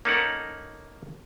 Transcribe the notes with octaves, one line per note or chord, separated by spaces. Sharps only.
A#3 C#4 D#4 A4 A#4 F#5